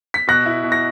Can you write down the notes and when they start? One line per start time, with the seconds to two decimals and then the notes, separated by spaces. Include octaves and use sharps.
0.14 B6
0.27 B2 F#6 A#6
0.46 E4
0.64 B2
0.72 A#6